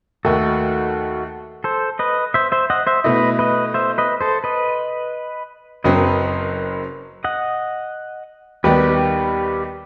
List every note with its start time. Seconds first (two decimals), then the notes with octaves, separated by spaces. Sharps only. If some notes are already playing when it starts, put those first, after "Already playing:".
0.25 D#2 D#3 A3 F#4 A4
1.64 A4 C5
1.99 B4 D#5
2.34 C5 E5
2.52 C5 E5
2.70 D#5 F#5
2.87 C5 E5
3.04 B2 A3 E4 B4 D#5
3.39 B4 D#5
3.74 C5 E5
3.98 B4 D#5
4.21 A4 C5
4.44 B4 D#5
5.84 F#1 F#2 F#3 C4 B4 D#5
7.24 D#5 F#5
8.64 D#2 D#3 G3 B3 G4 B4